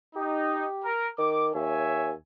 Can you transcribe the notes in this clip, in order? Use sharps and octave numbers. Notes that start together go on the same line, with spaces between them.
D#4 G4
A#4
D#3 D6
D#2 C#5 E5 G#5